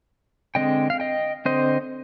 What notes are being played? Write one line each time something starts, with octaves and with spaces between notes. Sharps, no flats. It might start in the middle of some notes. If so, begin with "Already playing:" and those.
D3 G#3 C4 D#5 G5
F5
D#5 G5
D3 C4 C5 D#5